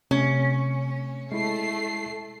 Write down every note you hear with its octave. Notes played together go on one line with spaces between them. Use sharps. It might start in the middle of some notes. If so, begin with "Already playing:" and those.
C3 A3 C#4
G#3 A3 E4 C7